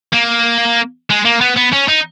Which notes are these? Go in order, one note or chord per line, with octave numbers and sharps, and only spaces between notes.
A#3
G#3
A#3
B3
B3
C#4
D#4